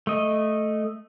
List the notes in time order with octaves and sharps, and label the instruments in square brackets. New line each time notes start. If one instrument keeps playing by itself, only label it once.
[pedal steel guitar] A3 D#5